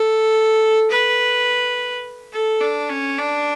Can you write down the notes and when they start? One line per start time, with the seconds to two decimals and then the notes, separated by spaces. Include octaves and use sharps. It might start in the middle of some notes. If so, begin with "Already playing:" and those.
Already playing: A4
0.91 B4
2.33 A4
2.61 D4
2.89 C#4
3.18 D4